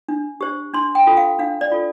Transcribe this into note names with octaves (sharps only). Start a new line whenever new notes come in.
D4
G4 C5
D4 C6
G5
F4 A4
F5
D4 F5
D5
F4 A4